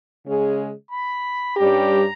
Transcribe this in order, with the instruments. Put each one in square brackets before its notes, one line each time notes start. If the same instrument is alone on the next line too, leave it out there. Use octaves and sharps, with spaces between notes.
[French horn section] C#3 G#3 C#4 G#4
[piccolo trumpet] B5
[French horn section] G2 G3 C#4 G4 [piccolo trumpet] A#5